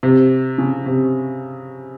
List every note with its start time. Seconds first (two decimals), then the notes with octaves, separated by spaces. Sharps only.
0.03 C3
0.58 C#3
0.86 C3